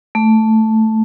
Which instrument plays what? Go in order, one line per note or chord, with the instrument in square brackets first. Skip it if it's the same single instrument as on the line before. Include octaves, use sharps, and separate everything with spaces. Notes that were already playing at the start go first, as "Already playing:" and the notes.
[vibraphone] A3